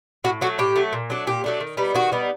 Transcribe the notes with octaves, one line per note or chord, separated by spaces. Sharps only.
A2 F#4
F#3 A3 F#4
A2 G4
F#3 A3
A#2
F#3 A3 D4
A#2 G4
F#3 A3 D4
D#3
G3 B3 D#4
D#3 F#4
G3 B3 D#4